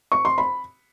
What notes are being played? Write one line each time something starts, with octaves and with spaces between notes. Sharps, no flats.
C#6
C6
B5